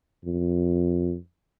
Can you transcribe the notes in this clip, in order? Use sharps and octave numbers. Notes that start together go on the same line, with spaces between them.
F2